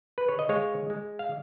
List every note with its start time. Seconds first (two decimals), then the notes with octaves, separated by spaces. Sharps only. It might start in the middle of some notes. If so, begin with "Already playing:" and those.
0.18 B4
0.29 C#5
0.39 D#5
0.49 G#3 C#5 F5
0.90 G#3
1.19 F5